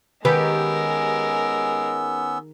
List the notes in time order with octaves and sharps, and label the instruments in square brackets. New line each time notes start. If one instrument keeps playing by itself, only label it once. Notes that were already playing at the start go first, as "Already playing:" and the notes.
[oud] D#3 G4 B4 [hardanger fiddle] G#3 A#4 [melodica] B3 C#4 E6